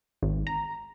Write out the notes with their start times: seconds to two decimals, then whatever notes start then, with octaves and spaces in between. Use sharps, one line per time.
0.23 G#1
0.47 A#5